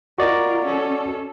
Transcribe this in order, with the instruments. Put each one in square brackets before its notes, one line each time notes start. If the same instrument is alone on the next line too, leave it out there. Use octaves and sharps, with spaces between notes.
[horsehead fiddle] F4 A#4 [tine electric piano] F#4 D5 D#5
[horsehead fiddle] C#4 A4